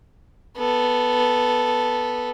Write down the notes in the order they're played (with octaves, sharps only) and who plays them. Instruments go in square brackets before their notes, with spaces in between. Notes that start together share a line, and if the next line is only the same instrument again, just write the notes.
[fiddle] B3 A4